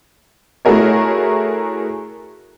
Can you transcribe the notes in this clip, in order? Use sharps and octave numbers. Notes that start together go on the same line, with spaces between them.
A3 E4 F#4 G#4 A#4 C#5